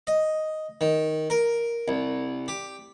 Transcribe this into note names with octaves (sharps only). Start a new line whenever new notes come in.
D#5
D#3
A#4
C2
G4